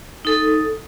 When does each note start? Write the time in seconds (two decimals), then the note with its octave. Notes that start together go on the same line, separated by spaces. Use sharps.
0.25 D#4 A4